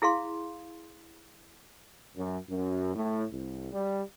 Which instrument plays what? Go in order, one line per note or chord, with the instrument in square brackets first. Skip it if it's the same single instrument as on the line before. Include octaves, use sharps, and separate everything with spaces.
[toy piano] E4 G#4 F5 C6
[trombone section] F#2
F#2
A2
C2
G3